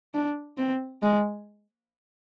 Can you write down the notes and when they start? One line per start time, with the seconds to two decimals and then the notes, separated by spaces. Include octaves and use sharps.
0.14 D4
0.58 C4
1.02 G#3